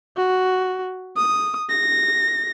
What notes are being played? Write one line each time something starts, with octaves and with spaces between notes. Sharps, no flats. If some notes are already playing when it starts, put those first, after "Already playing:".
F#4
D#6
A#6